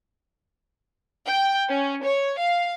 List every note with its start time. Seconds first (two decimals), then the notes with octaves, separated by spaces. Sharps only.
1.26 G5
1.70 C#4
2.05 C#5
2.39 F5